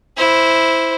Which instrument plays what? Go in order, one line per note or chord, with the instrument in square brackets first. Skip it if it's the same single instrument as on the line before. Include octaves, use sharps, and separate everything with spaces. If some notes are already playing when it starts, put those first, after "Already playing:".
[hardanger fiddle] E4 C5